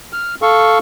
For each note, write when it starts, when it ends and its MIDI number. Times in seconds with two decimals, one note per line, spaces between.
0.13 0.35 89
0.42 0.79 69
0.42 0.79 77
0.42 0.79 85